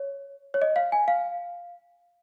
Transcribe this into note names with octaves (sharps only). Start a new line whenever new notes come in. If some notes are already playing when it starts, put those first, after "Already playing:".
Already playing: C#5
C#5
D#5
F5
G#5
F5